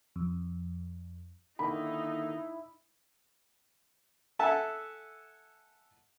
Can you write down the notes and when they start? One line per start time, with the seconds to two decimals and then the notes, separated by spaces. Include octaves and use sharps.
0.16 F2
1.59 D3 D#3 A#3 D#4 E4 B5
4.39 A4 E5 F#5 G#5 A5